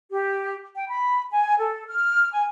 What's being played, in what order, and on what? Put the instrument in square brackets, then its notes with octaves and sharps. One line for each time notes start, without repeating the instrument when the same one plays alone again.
[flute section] G4
G5
B5
G#5
A4
F6
G#5